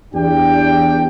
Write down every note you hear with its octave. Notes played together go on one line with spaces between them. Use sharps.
E2 D4 G4 G5